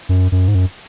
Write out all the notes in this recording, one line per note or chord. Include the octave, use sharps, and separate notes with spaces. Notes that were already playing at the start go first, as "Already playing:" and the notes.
F#2
F#2
G#2
F#2